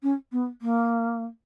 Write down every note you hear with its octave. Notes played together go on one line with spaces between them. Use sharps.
C#4
B3
A#3